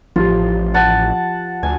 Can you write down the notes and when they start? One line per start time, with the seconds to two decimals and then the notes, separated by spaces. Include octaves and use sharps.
0.16 A1 F3 F4 G4
0.74 F#5 A5
1.63 D2 G#5